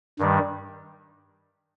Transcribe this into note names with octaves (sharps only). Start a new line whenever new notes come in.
G2 D#3 G3